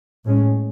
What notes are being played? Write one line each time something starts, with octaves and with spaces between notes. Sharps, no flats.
A2 G#3 C#4